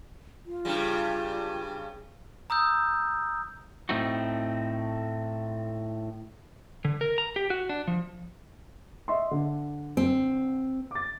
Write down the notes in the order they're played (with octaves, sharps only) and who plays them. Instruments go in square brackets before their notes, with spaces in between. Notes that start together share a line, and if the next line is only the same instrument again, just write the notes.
[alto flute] F4
[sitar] G2 C#3 G3
[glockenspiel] A#5 D#6 E6 G6
[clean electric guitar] A2 A3 C4 D#4 F#4
[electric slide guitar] D3
A#4
A#5
G4
F#4
D4
F3
[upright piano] D#5 E5 C6
D3
[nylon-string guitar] C4
[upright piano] D6 A6